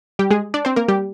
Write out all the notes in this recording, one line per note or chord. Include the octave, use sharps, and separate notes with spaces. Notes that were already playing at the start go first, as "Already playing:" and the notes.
G3 G4
G#3 G#4
D4 D5
C4 C5
A#3 A#4
G3 G4